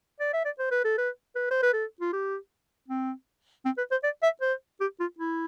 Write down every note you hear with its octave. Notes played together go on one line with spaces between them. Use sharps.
D5
E5
D5
C5
B4
A4
B4
B4
C5
B4
A4
F4
G4
C4
C4
B4
C5
D5
E5
C5
G4
F4
E4